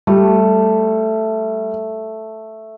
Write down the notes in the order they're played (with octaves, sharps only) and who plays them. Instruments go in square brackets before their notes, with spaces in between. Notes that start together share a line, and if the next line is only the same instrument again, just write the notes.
[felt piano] G3 [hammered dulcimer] A3